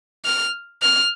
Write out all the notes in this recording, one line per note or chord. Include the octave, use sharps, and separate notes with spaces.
F6
F6